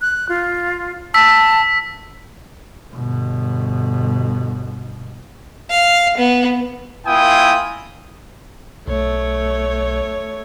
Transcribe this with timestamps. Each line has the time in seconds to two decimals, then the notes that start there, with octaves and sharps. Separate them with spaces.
0.01 F#6
0.29 F4
1.14 A5 E6 B6
2.92 G1 B2
5.70 F5
6.18 B3
7.06 A#3 E4 F4 G5 G#5 D#6
8.87 B1 A3 C#5